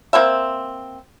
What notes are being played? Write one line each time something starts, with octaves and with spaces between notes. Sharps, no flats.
A#3 C4 E5